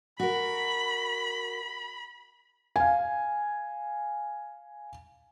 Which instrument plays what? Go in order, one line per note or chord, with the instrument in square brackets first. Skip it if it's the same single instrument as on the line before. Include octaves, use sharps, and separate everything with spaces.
[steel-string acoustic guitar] F#4 A#4 [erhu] B5
[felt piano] F5 G#5